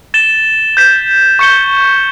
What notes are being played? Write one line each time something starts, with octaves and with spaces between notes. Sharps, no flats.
A6 E7 G7
G6 B6 E7
C#6 G6 C#7 G7